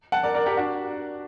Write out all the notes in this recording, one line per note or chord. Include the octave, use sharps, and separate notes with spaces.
F#5 A5
A#4 D5
A#4 D5
G4 A#4
D4 F#4